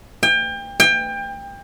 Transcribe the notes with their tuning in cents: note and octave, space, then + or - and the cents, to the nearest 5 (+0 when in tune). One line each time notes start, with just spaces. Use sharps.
G5 +30
G5 +25